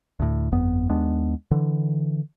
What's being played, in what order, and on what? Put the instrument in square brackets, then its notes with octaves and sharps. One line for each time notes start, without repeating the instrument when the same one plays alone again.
[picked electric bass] D2 A2
G1 F2 B3
D#2 G#3 B3 D4
D3 E3